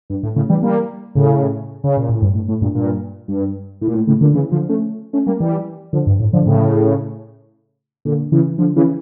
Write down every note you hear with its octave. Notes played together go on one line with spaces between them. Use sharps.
G2
A2
A2 C#3
E3 G3
G3 A#3
A2 C#3
C#3
A#2
A2
G2
A2
A2
G2 A#2
G2 A#2
G2
A2
A#2
A2
A2 C#3
A#2 D3
C#3 E3
D3 F3
A3 C#4
A3 C#4
G3 A#3
E3 G3
D3 F3
G2
A2
D3 F3
A2 C#3
A#2 D3
C#3 E3
D3 F3
C#3 E3